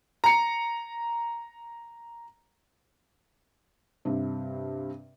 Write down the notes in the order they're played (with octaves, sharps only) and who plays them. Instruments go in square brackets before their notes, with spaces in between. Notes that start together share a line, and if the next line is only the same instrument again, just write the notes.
[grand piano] A#5 C#7
[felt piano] G2 C3